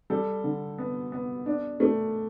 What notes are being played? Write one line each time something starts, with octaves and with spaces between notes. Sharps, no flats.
G3 A4
D3
B3
B3
D4
A3